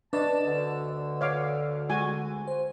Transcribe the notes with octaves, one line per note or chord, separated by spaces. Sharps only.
D4 B4 D5 D#5 A5
D2 D3
C#5 F5 D6
G#3 F#4 G#5
C5